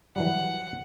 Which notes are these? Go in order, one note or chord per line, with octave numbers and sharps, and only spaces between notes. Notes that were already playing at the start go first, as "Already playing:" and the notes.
E3 F#3 G3 F#5